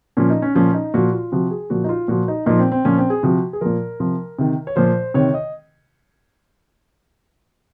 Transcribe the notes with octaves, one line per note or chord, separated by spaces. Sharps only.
A#2 F3 C#4
D#4
C#4
A#2 F3 C#4
D#4
A#2 F3 F#4
F4
C3 F3 F#4
G#4
A#2 F3 F#4
D#4
F4
A#2 F3 F#4
D#4
A#2 F3 D#4
C4
C4
A#2 F3 C#4
C4
G#4
C3 F3 F#4
G#4
A#2 F3 A#4
C3 F3
C3 D#3
C#5
A#2 F3 C5
C3 D#3 C#5
D#5